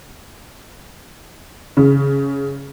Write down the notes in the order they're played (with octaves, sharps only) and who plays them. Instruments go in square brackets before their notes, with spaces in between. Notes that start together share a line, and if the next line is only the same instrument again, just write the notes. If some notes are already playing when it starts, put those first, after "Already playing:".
[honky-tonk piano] C#3